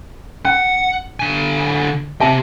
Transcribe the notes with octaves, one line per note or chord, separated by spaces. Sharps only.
C#4 F#5
D3 G#5
C4 G4 E5 A5